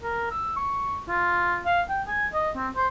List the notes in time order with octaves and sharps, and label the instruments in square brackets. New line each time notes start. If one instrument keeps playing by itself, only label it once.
[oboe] A#4
E6
C#6
F4
F5
G5
G#5
D#5
C4
C5